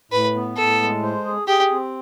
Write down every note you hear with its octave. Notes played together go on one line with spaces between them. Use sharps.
A2 B4
B3
A2 A4
G#3
C5
G#4
G4 G#4
C4